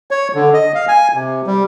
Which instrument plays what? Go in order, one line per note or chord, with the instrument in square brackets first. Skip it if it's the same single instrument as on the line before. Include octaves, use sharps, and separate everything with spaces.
[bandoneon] C#5
D3
D#5
F5
G#5
C3
G3